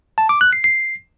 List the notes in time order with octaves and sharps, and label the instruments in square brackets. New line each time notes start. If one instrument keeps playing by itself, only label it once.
[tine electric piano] A5
D6
F#6
C7
C7